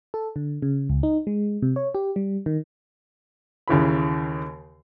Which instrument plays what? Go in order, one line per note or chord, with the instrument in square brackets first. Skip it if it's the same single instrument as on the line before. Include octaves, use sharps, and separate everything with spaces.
[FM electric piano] A4
D3
C#3
C#2
D#4
G#3
C3
C#5
G4
G3
D#3
[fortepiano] D#2 C#3 E3 B5